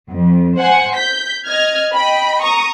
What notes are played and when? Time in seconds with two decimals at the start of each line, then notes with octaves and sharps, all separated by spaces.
0.10 F2
0.59 C5 F#5 G#5
0.96 G6 B6
1.45 D#5 F6 G#6
1.94 D#5 G5 B5
2.41 A#5 C#6 D#6